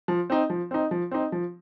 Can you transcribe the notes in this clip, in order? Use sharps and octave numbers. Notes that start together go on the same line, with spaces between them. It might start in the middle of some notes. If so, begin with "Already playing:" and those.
F3
C4 D#4
F3
C4 D#4
F3
C4 D#4
F3